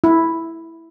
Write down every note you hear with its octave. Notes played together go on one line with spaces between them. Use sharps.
E4